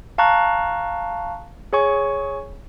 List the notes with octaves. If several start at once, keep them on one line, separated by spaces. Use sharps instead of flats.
F5 A5 A#5 C#6 F#6
G#4 C#5 G#5 C#6